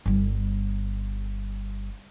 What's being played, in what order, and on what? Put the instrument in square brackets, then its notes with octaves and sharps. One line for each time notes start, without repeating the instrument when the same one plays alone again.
[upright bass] G1 G3